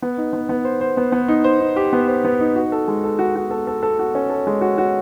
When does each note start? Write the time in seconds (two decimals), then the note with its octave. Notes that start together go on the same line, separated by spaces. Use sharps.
0.02 B3
0.18 D#4
0.33 B3
0.49 B3
0.65 C5
0.81 C5
0.97 B3
1.12 B3
1.28 D#4
1.44 C5
1.60 D#4
1.76 G4
1.93 B3
2.07 C5
2.25 B3
2.40 D#4
2.55 F#4
2.72 A4
2.88 G#3
3.04 A4
3.19 F#4
3.36 F#4
3.51 A4
3.67 A4
3.83 A4
3.99 F#4
4.15 C#4
4.30 A4
4.47 G#3
4.61 F#4
4.78 F#4